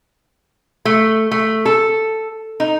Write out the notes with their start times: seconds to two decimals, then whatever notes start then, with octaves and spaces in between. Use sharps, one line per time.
0.85 A3
1.31 A3
1.65 A4
2.60 D#4